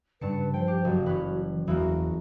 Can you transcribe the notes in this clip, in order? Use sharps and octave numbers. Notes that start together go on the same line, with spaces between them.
G2 C#3 B4 A5 C#7
F3 C5 G5
G4
F#1 F#4
E3 C#4 B4
E2 E3 G#3 A#3 F#4